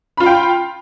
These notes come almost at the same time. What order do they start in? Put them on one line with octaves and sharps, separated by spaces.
B5 F4 F5 G5